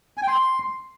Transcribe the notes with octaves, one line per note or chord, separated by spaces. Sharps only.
G#5
G5
C6